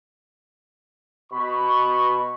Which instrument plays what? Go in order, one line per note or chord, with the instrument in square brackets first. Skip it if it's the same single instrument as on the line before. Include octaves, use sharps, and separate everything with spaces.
[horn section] B2 B5 [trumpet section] C#6